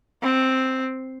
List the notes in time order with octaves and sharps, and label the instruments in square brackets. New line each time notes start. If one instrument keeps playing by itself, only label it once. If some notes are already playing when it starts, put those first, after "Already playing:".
[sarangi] C4